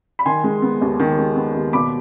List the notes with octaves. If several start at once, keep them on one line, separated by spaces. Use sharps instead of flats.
B5
D#3 G#5 C6
G#3
B3
D#2
D#3
G#3
B3
D#2
B2 B5 D6